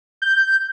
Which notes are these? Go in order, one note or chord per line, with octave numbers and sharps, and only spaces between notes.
G6